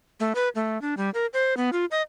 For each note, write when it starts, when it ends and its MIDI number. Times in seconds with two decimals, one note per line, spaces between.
0.20 0.33 57
0.35 0.49 71
0.55 0.80 57
0.82 0.95 62
0.97 1.10 55
1.14 1.26 70
1.33 1.57 72
1.57 1.70 59
1.73 1.85 65
1.91 2.02 75